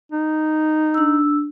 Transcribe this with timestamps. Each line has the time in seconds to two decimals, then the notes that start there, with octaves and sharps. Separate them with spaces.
0.12 D#4
0.94 D4 E6